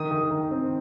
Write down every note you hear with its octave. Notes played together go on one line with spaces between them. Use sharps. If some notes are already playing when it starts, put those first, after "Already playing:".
Already playing: D#3 D#6
D#3
D#3
C4